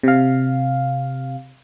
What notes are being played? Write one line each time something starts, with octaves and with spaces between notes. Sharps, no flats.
C3 F5